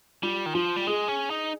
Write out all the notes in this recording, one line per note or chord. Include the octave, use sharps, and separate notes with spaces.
G3 F4
D#3
F3 F4
G3
G#3 G#4
C#4
D#4